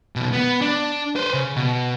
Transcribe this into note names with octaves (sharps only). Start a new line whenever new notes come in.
B2 D#3
B3
D4
B4 C5
C#3
B2